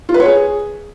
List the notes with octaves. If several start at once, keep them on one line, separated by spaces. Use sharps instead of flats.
F4
B4
C#5
G#4